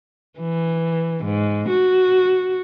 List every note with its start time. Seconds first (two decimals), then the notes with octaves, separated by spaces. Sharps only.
0.39 E3
1.24 G#2
1.69 F#4